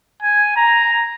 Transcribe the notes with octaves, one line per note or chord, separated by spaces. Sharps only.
G#5
A#5